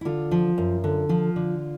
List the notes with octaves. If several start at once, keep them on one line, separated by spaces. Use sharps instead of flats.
E4
D3 F4
F3
F#2
D3
F3 F4
D3